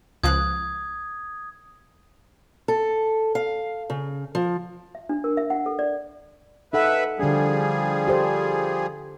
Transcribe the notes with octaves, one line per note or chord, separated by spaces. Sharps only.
C#2 F3 D#6 F#6 G#6
A4
F5
C#3
F3
E5
D4
A#4
E5
F#5
A4
D5
D#4 A4 B4 E5 F#5
D3 F3 G3 D4 G#4
G4 A4 C5